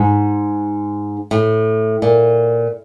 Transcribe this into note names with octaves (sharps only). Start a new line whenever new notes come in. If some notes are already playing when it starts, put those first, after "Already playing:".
Already playing: G#2
A2
A#2